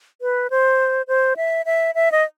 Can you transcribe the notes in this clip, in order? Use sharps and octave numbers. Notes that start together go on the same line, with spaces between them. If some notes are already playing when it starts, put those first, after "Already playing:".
B4
C5
C5
E5
E5
E5
D#5